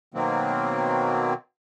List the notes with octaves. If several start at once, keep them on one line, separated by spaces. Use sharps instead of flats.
B2 D#3 F#3 A#3 C4